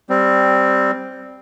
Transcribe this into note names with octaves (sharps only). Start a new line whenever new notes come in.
G3 C4